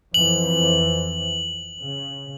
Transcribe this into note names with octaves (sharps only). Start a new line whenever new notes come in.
F2 E3 F#7
C#3